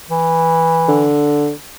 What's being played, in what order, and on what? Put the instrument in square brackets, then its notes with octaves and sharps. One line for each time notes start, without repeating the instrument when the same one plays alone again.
[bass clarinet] E3
[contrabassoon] D3